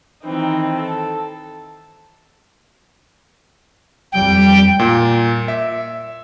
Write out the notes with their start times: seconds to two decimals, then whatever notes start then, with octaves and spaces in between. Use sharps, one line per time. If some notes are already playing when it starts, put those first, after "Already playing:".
0.23 D#3 E3 C4 D#4
0.74 A4
4.12 F2 G3 G5
4.79 A#2
5.48 E5